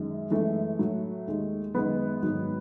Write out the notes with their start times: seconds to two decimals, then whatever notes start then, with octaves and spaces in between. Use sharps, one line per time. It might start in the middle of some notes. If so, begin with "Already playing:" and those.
Already playing: F#2 D#3 G#3
0.30 F#2 E3 G#3 A3
0.79 A2 F#3
1.27 D#2 D#3 G#3
1.75 F#2 D#3 G#3 B3
2.22 G#2 D#3 F#3